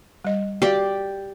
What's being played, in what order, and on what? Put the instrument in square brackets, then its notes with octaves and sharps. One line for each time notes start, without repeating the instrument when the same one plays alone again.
[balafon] G3 D#5
[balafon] F#4 F5 [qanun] G4 D5